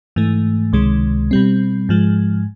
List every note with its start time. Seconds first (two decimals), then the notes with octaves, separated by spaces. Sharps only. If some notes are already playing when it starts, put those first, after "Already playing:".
0.16 G#2 E3 A3
0.73 C#2 C3 D#3 G#3
1.31 B2 G3 C4
1.89 G#2 F3 G#3